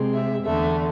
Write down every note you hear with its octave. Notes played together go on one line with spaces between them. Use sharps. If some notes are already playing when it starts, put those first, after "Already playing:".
Already playing: C3 G#3 C4
E5
E2 D3 A3 E5